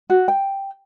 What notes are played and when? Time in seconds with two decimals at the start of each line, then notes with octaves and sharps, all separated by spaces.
0.10 F#4
0.28 G5